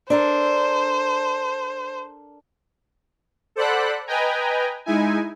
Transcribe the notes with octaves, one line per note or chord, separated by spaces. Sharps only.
D4 A4 A#4 C5
A4 C5 D5 F#5 B5 F#6
B4 D#5 G5 G#5 A#5
G#3 D#4 E4 G#5